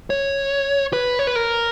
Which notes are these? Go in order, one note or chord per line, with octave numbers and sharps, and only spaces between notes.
C#5
B4
C#5
B4
A#4